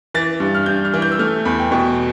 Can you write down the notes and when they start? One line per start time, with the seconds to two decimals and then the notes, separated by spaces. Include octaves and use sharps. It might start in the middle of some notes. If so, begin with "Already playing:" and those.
0.14 E3 A6
0.40 G2
0.55 F6
0.66 G2 G6
0.85 F6
0.94 E3
1.02 G6
1.12 E6
1.19 A3 F6
1.45 E2 B5
1.59 G5
1.72 B2 G5